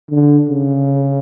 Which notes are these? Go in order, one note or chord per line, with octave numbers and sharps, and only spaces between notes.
D3
C#3